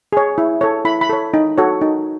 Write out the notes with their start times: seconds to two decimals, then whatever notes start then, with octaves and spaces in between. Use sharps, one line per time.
0.12 G#4 C#5
0.38 E4
0.61 A4 C#5
0.85 E4 B5
1.01 B5
1.09 A4 C#5
1.34 D#4
1.58 F#4 A4 C#5
1.81 D#4